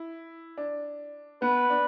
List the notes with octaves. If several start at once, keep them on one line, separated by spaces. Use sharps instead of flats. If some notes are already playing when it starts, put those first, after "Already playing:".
Already playing: E4
D4
B3 B4
D4